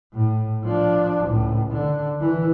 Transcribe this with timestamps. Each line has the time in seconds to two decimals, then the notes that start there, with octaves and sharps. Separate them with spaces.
0.13 A2
0.64 F3 D4
1.26 C#2 A2
1.71 D3
2.21 E3